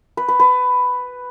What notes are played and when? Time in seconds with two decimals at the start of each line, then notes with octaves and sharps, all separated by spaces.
0.17 B4
0.28 B4
0.40 B4